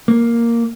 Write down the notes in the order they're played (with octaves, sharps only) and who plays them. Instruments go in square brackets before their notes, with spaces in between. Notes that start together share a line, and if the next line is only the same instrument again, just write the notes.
[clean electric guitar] A#3